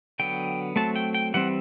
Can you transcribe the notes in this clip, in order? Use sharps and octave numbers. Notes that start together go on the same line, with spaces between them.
D3 F#3 B3 G5
F#3 A3 C4 A5
G5
G5
E3 G3 C4 F#5